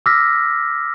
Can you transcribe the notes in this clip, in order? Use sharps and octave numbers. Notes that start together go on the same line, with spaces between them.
D6 E6 F6 A#6 B6